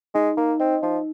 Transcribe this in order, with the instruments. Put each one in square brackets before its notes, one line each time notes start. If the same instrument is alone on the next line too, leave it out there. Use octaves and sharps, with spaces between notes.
[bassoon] G#3 [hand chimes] D#4
[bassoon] A#3 [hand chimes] D#4
[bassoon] C4 [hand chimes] D#5
[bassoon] F3 [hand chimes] D#4